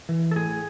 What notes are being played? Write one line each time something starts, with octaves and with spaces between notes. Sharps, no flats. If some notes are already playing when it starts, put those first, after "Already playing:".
E3
A4
A2 G#4